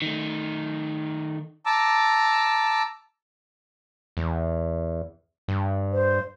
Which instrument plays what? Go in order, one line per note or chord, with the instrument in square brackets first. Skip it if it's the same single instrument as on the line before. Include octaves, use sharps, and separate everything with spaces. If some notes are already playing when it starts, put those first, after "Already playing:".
[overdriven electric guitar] D#3 A3
[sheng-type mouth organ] A5 A#5 D6 E6
[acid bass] E2
G2
[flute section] C5